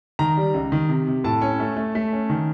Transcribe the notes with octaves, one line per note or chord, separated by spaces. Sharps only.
D#3 A#5
G3
C#2
D#3
C3
C3
A2 A5
C#4
A3
A3
A3
C#4
D#3